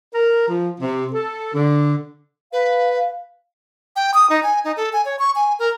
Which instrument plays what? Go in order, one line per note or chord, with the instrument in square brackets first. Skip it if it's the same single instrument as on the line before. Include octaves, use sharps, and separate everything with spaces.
[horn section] A#4
F3
C3
A4
D3
[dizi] B4 [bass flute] F5
[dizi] G5
D#6
D#4
G#5
D#4
A4
G#5
C#5
C#6
G#5
A#4